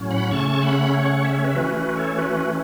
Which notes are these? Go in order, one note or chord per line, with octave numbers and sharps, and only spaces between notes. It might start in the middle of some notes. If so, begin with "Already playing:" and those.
Already playing: A2 F#3 C#4
F#5 B5
C#3 A3 C#4 A5 C#6
F#5 B5
C#5 F#5
E5
C#5
B4 E5
E3 A3 C#4 F#4 B4
F#4 B4
A4 C#5
F#4 B4